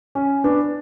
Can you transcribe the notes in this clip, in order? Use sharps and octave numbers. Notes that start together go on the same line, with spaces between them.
C#4
B3 D4